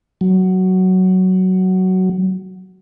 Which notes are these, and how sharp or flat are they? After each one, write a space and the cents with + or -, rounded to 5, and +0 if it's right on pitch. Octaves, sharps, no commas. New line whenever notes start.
F#3 +10